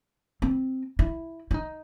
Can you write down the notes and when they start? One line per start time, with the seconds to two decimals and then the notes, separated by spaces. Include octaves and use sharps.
0.42 C4
0.99 E4
1.51 E4
1.54 D#4